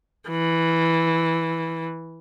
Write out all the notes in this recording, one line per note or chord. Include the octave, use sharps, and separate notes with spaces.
E3